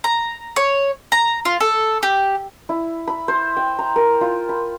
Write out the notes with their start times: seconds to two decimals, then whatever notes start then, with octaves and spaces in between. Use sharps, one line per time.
0.04 A#5
0.56 C#5
1.12 A#5
1.45 F4
1.61 A4
2.03 G4
2.69 E4
3.07 B5
3.28 C5
3.57 G5
3.79 A#5
3.96 A#4
4.21 F4
4.49 B5